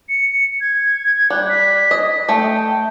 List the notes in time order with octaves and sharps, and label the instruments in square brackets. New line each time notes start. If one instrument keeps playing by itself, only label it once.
[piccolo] C#7
G#6
[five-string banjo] G3 [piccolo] F#6
[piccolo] B6
[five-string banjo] D#5
[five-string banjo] A3 [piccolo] G5